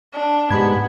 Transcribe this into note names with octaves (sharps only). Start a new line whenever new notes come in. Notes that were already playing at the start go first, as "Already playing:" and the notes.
D4
G#2 B3 G4 B5 G#6